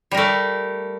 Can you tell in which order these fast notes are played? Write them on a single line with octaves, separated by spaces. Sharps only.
G3 A#4 A3